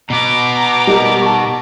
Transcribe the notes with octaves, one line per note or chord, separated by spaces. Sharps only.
B2 B3 A#5 D6
G3 D#4 A#4
A5 C#6